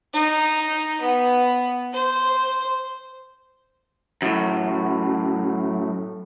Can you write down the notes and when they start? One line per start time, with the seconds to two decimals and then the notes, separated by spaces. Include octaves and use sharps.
0.13 D#4
1.01 B3
1.92 C5
4.22 F#2 A2